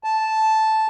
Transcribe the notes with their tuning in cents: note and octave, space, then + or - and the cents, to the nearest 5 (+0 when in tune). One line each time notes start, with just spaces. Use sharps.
A5 -5